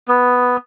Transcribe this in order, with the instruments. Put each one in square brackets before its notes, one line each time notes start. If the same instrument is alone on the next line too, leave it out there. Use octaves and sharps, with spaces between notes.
[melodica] B3